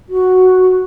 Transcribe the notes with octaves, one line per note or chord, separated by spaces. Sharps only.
F#4